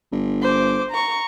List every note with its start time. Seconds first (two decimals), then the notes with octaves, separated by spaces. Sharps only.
0.12 G1
0.43 C5 D6
0.91 A#5 C#6